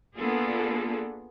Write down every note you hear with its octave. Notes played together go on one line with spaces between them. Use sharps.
A#3 B3 D4 F4 G#4 A4